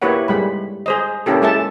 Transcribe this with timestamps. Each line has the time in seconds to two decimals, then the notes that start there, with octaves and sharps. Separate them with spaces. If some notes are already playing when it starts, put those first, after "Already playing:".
0.02 A#3 E4 G4 B4 C#5 F#5
0.28 G3 G#3 B5
0.86 G#4 C5 D#5
1.26 A#3 C#4 E4 G4 A4
1.42 G#3 A4 E5 A5